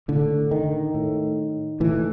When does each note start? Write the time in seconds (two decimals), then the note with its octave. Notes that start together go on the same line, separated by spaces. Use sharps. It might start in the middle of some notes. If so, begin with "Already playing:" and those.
0.08 A2 D3
0.51 D#3
0.94 A2
1.80 A2 E3